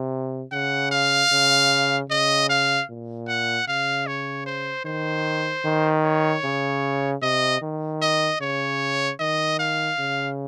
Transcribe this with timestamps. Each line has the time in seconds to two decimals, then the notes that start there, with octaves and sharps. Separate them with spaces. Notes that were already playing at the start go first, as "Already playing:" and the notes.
Already playing: C3
0.52 C#3 F#5
0.91 F5
1.32 C#3
2.10 C#3 D#5
2.49 F5
2.89 A#2
3.28 F#5
3.68 C#3 F5
4.07 C#5
4.46 C5
4.85 D#3 C5
5.65 D#3
6.04 C#5
6.44 C#3
7.22 C3 D#5
7.61 D#3
8.02 D#5
8.41 C#3 C#5
9.19 D#3 D#5
9.59 F5
9.99 C#3